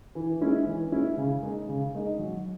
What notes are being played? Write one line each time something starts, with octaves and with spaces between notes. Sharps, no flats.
E3
G#3 C#4 E4
E3
G#3 C#4 E4
C#3
G#3 D#4
C#3
G#3 D#4
F#3